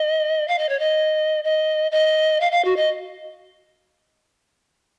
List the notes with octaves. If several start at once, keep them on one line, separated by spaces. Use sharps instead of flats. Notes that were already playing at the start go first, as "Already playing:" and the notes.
Already playing: D#5
F5
D#5
C#5
D#5
D#5
D#5
F5
F5
F#4
D#5